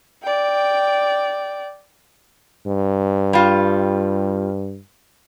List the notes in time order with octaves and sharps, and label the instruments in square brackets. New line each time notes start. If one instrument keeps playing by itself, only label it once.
[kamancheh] D5 G5
[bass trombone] G2
[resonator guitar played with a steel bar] G3 F4